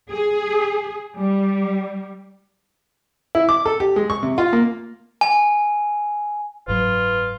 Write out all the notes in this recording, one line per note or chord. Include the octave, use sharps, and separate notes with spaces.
G#4
G3
E4
D6
A4
G4
G#3
C#6
C3
F4
A#3
G#5
F#1 G#2 F#3 F4 B4